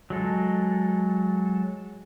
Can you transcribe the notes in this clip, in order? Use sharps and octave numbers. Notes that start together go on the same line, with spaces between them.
F#3 G#3 A4